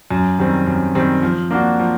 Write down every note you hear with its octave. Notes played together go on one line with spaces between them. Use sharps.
F#2
D#3 G3 C4
F#2
D#3 G3 C4
F3
A#3 D4 F#4
F3